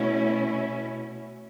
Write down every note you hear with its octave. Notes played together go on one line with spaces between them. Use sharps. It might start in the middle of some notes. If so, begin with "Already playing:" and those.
Already playing: B2 A3 C#4 E4